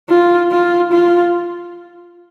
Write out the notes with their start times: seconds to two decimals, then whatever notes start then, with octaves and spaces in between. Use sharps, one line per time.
0.10 F4
0.52 F4
0.92 F4